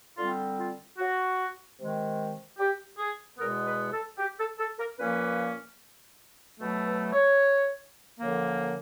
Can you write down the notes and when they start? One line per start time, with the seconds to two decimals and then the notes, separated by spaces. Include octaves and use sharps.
0.18 D3 G3 C4 F4
0.58 F4
0.98 F#4
1.78 C3 D#3 G#3
2.59 G4
2.98 G#4
3.38 E2 B2 G#3 B3 A#4
3.66 B4
3.92 A4
4.19 G4
4.39 A4
4.59 A4
4.78 A#4
4.99 A#2 F3 A#3 C#4 B4
6.59 B2 F#3 A3
6.86 B4
7.12 C#5
8.19 F#2 D3 F3 A#3